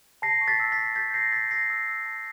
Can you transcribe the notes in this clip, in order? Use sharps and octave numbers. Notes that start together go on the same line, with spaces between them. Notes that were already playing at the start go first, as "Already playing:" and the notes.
A5 A#6 C7
C#6
A6 B6
E6
A6 B6
A5
G6 A6 B6
G6 A#6 C7
E6 A6 B6
E6 A#6 C7
E6
E6
A5